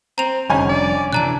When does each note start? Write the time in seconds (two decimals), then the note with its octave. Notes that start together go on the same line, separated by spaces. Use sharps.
0.18 C4 A#5 F7
0.50 F1 D3 G3 C#4 D#4 G#5
0.69 D5
1.13 C3 E3 D4 A5 A#5 F#6